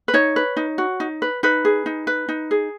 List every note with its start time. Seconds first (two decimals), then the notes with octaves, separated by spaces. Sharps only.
0.08 B4
0.14 D#4 C#5
0.36 B4
0.57 D#4
0.78 F#4
1.00 D#4
1.22 B4
1.43 D#4 B4
1.65 G#4
1.86 D#4
2.07 B4
2.29 D#4
2.51 G#4